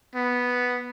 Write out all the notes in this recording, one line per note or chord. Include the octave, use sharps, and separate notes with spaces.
B3